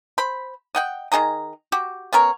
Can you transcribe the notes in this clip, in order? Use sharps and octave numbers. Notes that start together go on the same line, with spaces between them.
C5 B5
D#5 F#5 G5
D#3 G#4 D#5 A#5
F#4 G4
B3 C#4 A#4 C#5